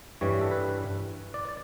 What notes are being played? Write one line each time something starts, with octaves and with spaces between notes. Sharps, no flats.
G2 E3 G3 C#5
A4
B4
D5
D5